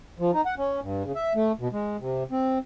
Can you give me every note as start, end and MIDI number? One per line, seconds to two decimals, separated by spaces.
0.19 0.31 53
0.34 0.41 63
0.46 0.55 78
0.58 0.80 61
0.82 1.03 43
1.04 1.12 49
1.15 1.33 76
1.35 1.52 57
1.60 1.68 47
1.73 1.97 56
2.00 2.24 48
2.31 2.58 60